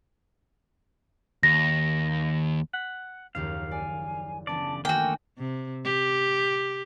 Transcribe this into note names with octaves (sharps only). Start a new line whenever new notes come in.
D#2 A#6
F#5 B6
F#1 D#2 F3 F5
D5 G#5
C#3 E3 B3 D4 D5 A5
D#3 A3 A#3 F#4 G5 G#5
C3
G4